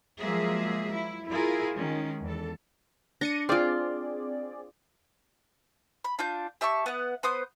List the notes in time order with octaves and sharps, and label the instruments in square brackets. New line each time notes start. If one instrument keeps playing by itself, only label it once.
[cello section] F3 F#3 G#3 A#3 G#4 E5
E4
E4 F4 G#4 A#4
D#3 G#3 C#4
E2 A4
[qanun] D4 [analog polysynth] A#6 C#7 D#7
[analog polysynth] C4 G#4 D5 [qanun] F4 F5
[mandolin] B5
D4 F4 G6
G4 E5 A5 C#6
B3 F#5
B3 C5 D#6 G6